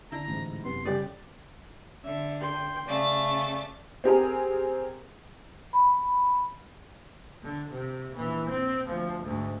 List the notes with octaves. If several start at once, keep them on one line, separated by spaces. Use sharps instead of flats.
D3 E4 A#5
A1 G#2
F#2 C3 B3 C6
C#3 G3 G4 D5
D3 E5
G5 C6
C#3 A3 D5 A6
C4 G4 G#4 A#4
B5
D3
C3
A#1 E3
C4
D2 F3
D2 G#2